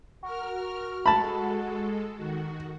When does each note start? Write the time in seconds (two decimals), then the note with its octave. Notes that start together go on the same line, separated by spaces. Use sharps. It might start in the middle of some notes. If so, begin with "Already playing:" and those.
0.23 F#4 A#4 F6
1.06 G#3 A4 A5 B5
2.16 D#3 F#4